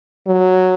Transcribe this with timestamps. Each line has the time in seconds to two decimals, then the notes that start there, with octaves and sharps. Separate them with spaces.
0.27 F#3